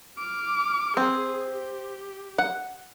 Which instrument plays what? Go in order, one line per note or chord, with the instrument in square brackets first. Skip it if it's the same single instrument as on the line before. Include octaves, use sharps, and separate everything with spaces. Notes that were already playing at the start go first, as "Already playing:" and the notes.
[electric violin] D6 F6
[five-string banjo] C4 [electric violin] G#4
[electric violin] G4
[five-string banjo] F#5